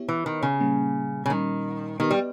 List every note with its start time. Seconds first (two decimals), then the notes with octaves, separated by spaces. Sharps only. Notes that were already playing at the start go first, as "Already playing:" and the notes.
Already playing: B3 E4 G4 C#5 E5
0.09 E3
0.26 D#3
0.42 C#3
0.60 A#2 G3 A#3 C#4
1.26 C#3
1.30 A#2 D#3 G3 C#4
2.00 D#3 B3 G4 B4 D#5
2.11 G3